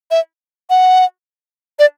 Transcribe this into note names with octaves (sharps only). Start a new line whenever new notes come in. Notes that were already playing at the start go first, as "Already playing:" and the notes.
E5
F#5
D5